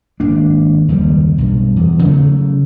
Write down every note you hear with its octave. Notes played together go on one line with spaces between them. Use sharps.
G#1 A#3 D4
F#1 D#2 A#2 G3
B1 G2
E2
C#3 F#3 G3 A3